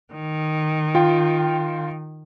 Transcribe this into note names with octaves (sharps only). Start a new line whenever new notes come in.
D#3
F4 G5